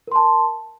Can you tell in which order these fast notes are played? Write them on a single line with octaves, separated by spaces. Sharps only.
A#4 C6 A5